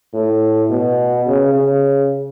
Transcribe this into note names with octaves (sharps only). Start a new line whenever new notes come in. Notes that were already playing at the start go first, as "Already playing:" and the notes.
A2
B2
C#3
C#3